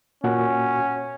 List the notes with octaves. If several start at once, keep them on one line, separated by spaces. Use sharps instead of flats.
A#2 C#4 F#4 F#5